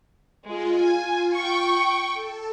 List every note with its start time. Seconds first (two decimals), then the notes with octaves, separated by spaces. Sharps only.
0.47 G#3 F4
0.80 G#5
1.35 G5 C#6
2.13 A4